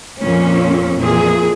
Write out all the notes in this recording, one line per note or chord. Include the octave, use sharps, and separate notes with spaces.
F2 A#2 C#4
F2 A#2 E3 G#4